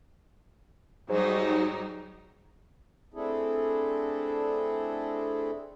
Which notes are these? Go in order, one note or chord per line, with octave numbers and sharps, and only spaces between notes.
G#2 F#3 G3 D#4
A3 C4 D4 E4 G#4 A4